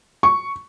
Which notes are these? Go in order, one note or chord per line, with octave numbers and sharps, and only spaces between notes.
C#6